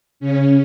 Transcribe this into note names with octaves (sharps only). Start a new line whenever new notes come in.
C#3 C#4